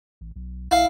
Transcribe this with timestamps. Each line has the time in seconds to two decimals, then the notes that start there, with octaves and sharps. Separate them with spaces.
0.21 A1
0.36 B1
0.71 B1 E4 F5